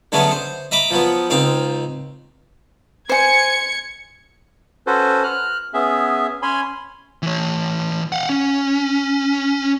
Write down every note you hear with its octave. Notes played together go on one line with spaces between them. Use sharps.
D3 F#3 G#3 A3 B3 C#4
C5
D#5 E5 A#5 B5 D6
F3 F#3 B3
C#2 C4 D#4 F5
C5 G#5 G#6 C#7
C#4 F#4 A4 B4 C5
F6 F#6
B3 C#4 G#4 E5
C#4 C#5 G#5 B5 C6
E3 C#5
F5 F#5
C#4